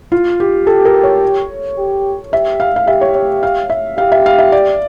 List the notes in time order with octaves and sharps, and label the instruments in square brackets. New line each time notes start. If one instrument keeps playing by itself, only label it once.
[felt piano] F4
G4
[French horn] G4 [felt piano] A4
[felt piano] A#4
C#5
[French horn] G4
[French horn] G4 [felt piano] E5
[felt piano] F5
F5
[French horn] G4 [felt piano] E5
[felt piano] C#5
C#5
F5
E5
[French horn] G4 [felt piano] F5
[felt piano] E5
F5
E5
D5